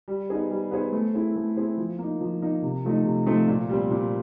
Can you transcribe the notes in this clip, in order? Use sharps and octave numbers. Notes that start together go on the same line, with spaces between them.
G3
B3 D#4 G#4 C5
G3
B3 D#4 G#4 C5
A3
C4 E4 G#4 C5
A3
C4 E4 G#4 C5
F3
A#3 D#4
F3
A#3 D#4
C3
F3 A3 C4 D#4
C3
F3 A3 C4 D#4
A#2
G3 C4
A#2